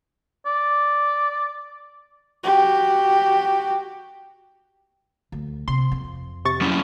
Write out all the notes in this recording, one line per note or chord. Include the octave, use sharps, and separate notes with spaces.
D5
F#4 G4
D2
C3 C6
F2
C3 C#6 A6
F#3 C#4 E4